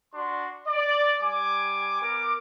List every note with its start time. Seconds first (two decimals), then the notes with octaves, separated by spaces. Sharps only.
0.14 D4 F#4 C6
0.67 D5
1.22 G3 G#5 D6
2.01 B3 A#4 D6